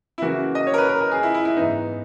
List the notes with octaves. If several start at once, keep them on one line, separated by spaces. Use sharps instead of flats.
E4
C#3 E3 A#3 F#4
D#5
C#5
A#4
B4
A#4
A#4
G#4
E4
E4
E4
G#2 E3 B3 D#4